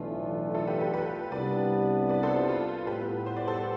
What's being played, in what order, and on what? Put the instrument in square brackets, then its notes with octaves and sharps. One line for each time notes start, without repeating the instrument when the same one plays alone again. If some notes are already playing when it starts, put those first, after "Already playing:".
Already playing: [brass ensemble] B1 A2 E3 A3 D4 [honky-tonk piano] F4
[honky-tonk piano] F4 A4
G4 B4
G4 B4
G4 B4
[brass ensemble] C2 C3 G3 B3 D4 [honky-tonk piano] B4 D5
[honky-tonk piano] B4 D5
A4 C5
F4 A4
F4
[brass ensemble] A2 G3 B3 E4 [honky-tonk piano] G4 B4
[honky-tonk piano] C5
D5
A4 C5